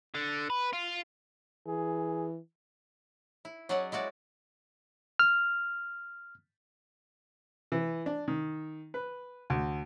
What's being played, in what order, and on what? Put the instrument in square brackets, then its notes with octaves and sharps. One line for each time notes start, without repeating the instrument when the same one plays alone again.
[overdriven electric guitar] D3
B4
F4
[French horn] E3 [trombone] G#4
[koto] E4
F#3 C#4 G#4 D5 D#5 F#5
G#3 E4 F#4 D5
[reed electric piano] F6
[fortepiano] E3
D4
D#3
B4
D2